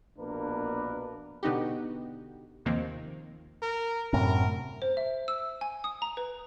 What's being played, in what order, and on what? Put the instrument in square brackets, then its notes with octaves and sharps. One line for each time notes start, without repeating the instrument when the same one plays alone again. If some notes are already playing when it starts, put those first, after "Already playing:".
[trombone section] A#1 B2 A#3 D4 A#4 B4
[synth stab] B2 D3 B3 D#4 F#4 G4
D#2 C3 D#3 F3 A#3 C4
[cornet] A#4
[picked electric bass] F#2 A2 C3 [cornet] A#4
[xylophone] C5
E5
E6
G#5
D#6
A#5
B4